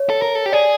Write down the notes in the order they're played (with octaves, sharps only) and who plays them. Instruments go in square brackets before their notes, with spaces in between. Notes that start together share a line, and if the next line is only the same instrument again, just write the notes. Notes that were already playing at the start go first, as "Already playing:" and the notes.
Already playing: [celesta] C#5
[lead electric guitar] A4
A#4
A4
G4
[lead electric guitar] G#4 [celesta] D5